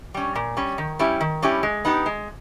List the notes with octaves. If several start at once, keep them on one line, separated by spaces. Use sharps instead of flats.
G3 C#4
A#2
G3 C#4
D#3
G3 C#4 E4 G4
D#3
G3 C#4 E4 G4
G#3
B3 D#4 G4
G#3